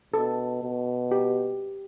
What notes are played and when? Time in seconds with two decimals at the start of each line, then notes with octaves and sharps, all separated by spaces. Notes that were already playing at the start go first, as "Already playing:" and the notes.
0.14 B2 A4
0.63 B2
1.11 G4